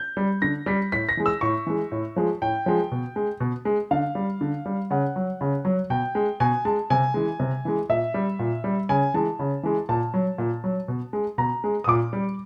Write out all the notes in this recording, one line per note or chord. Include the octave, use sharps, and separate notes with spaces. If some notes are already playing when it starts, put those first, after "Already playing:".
Already playing: G6
G3
D3 A#6
G3 B6
A2 B6
A#6
E3 G#3
E6
A2 C#6
E3 G#3
A2
F3 G#3
A2 G5
F3 G#3
B2
G#3
B2
G#3
D3 F5
G3
D3
G3
C#3 F#5
F#3
C#3
F#3
B2 G5
G#3
B2 G#5
G#3 A5
C3 G#5
E3 G#3
C3
E3 G#3
A#2 E5
G3
A#2
G3
C#3 G#5
E3 G#3 A5
C#3
E3 G#3
A#2 A5
F#3
A#2
F#3
B2
G#3
B2 A#5
G#3
D#6
A#2 D6
G3